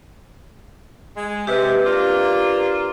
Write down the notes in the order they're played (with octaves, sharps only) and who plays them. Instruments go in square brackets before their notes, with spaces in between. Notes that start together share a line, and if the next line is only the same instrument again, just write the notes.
[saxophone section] G#3
[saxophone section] C3 [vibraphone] G4 B4
[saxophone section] A#3 D4 F4